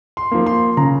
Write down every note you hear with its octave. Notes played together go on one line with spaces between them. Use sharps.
C6
F3 A#3
C6
C#3 A#5